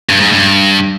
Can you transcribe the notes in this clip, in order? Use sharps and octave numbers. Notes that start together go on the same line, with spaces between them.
G2
G#2
G2